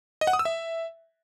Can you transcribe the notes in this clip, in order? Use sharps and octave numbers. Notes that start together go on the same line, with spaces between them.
D#5
F#5
D#6
E6
E5